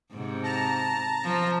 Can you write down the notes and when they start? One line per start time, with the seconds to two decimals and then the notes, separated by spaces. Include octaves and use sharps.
0.12 G#2 C3
0.44 A5 A#5
1.24 F3